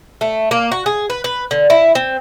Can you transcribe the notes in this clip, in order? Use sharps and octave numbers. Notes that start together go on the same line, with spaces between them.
A3
A#3
F#4
G#4
B4
B4
D3
E4
C4